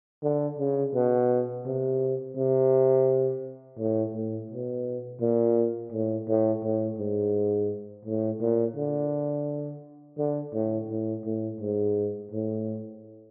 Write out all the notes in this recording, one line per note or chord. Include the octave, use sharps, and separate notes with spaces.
D3
C#3
B2
C3
C3
A2
A2
B2
A#2
A2
A2
A2
G#2
A2
A#2
D3
D3
A2
A2
A2
G#2
A2